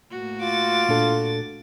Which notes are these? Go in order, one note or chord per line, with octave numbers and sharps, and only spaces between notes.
A2 A#3 F#4
F4 D6 A6
A#2 D4 A4